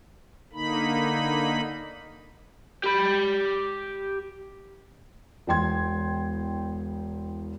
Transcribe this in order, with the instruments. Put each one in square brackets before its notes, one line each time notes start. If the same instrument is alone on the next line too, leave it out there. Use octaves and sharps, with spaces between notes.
[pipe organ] D3 A#3 D#4 B5
[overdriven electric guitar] G4 B5
[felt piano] E1 E2 G5 C6 G#6